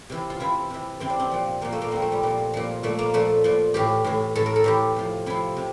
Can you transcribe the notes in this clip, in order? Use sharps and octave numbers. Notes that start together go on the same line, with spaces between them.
C3 E3
F4
C3 E3 E4
C3 E3
C3 E3 C4
D4
C4
A#2 F3
A#2 F3 A#3
A3
A#3
A#2 F3 C4
A3
G3
A#2 F3
A#2 F3
A#2 F3 A3
A#3
A#2 F3 A3
A#2 F3
A2 E3 G4
A2 E3
A2 E3 A4
A#4
A4
A2 E3 G4
C3 F3
C3 F3 E4
C3